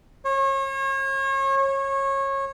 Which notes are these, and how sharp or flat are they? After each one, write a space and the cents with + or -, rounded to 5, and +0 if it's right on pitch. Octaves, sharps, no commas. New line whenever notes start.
C#5 -35
C#5 -25